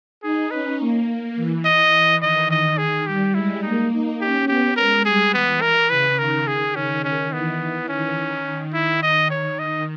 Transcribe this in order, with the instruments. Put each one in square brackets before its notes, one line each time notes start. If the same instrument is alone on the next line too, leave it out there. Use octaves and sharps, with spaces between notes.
[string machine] D#4 [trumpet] G#4
[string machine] C#4 [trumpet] B4
[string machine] A#3
E3
[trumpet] D#5
[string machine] E3
[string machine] D#3 [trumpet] D#5
[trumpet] D#5
G#4
[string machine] G3 [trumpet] G4
[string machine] G#3 [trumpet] E4
[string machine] A#3 [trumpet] D#4
[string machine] D#4
[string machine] C#4 [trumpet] G4
[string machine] B3 [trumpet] G4
[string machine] G#3 [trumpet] A#4
[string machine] G3 [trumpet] G#4
[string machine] E3 [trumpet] B3
[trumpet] A#4
[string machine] C#3 [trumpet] B4
[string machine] D#3 [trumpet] A#4
[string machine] D#3 [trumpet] G#4
[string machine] C#3 [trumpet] C#4
[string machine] D#3 [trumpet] C#4
[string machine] E3 [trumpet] B3
[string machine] D#3 [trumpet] C#4
[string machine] D#3
[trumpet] E4
D#5
[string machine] D#3 [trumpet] C#5
[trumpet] D#5